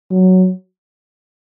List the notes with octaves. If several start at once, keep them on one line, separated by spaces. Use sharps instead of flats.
F#3